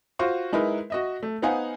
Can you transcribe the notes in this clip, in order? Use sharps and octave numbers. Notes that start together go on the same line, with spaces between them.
F4 F#4 C5 C#6
G#3 D#4 E4 A#4 B4
F#4 D#5 E5
A3
B3 D#4 C5 F5 F#5 G#5